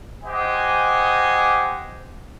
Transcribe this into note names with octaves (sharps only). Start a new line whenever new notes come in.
G4 C5 D#5 F#5 G#5